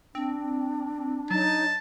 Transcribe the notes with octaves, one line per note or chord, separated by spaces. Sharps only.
C4 D4
F#3 D#4 A5